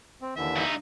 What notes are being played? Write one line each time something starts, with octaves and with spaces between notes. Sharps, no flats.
C4
D#2 D3 E3 E5
G2 D#4